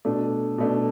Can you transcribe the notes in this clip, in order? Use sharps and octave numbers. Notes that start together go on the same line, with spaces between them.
B2 A3 D4
B2 A3 D4